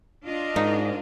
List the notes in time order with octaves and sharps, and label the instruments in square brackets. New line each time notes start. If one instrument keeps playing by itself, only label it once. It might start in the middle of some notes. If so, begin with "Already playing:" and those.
[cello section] D4 F4 D#5
[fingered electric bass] G#2 [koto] D#4 [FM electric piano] A#4 D5 F5